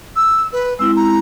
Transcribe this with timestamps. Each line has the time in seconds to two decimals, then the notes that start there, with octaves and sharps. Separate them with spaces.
0.16 E6
0.53 B4
0.79 G#3 C4 E4 E6
0.96 A#5